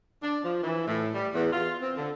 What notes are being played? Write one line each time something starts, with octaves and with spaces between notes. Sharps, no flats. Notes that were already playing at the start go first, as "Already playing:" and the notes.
D4
F3
E3
A2
G3
E2
F4
C4
D3